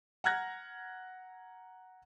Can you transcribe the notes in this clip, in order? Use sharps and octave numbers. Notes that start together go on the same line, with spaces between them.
F#5 A#5 F6 F#6 G#6 A#6